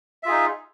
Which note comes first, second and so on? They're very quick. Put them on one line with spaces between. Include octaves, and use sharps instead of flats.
E5 F4 G#4 D#4